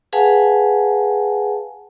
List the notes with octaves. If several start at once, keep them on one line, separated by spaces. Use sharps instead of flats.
G#4 B4 F5 F#5 G#5 A5